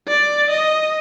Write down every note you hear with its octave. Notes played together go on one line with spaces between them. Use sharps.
D5
D#5